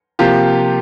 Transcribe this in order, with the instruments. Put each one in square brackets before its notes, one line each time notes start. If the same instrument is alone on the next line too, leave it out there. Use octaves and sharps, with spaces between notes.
[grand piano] C3 F3 A#3 F4 G4